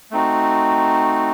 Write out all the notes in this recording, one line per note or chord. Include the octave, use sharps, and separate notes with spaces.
A3 C4 D#4 F#4